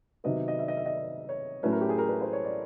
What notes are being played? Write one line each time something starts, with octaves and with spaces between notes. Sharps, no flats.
C3 D#3 F#3 B3 D#5
D#5
E5
D#5
E5
D#5
C#5
A2 F#3 A3 C#4 B4
A#4
G4
G#4
A#4
B4
C5
C#5
D5